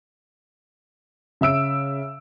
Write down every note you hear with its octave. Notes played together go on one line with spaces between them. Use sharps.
C#3 E5 E6 D7